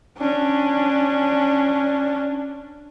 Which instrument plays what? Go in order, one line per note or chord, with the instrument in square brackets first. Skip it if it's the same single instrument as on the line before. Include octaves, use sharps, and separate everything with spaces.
[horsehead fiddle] C#4 D4